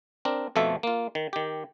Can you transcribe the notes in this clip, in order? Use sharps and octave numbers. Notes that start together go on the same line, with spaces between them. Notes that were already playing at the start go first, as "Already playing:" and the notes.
C4 D4 A#4
F2 B2 F3 A3 A4 E5
A#3 F4
D#3
D#3 G4